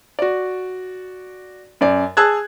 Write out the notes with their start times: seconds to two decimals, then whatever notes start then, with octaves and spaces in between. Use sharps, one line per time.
0.19 F#4 D5
1.81 F#2 D5
2.17 G#4 A5 E6 F#6 G#6